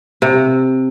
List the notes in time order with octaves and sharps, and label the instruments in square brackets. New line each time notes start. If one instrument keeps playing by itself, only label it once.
[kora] C3